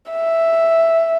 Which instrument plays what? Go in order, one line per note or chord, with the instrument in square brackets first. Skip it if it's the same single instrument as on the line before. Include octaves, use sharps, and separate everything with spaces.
[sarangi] E5